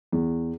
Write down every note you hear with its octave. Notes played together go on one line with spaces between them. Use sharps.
E2